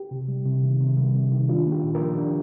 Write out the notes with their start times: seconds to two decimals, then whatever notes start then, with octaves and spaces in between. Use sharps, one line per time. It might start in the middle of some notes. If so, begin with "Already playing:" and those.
Already playing: G4
0.11 C3
0.28 G3
0.45 C3
0.63 D#3
0.81 C3
0.97 G3
1.15 C3
1.32 D#3
1.49 D4 F4
1.66 A#3
1.72 G4
1.84 A#2
1.95 G4 A#4
2.01 F3
2.18 D4